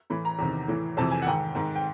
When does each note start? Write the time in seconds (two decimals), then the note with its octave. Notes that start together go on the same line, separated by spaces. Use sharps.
0.10 A2 E3 B5
0.25 A#5
0.39 E2 C3 D#3
0.68 A2 E3
0.97 F2 C3 E3 A5
1.11 G#5
1.22 F#5
1.27 G#2 D#3 G5
1.55 G#2 D#3
1.76 G5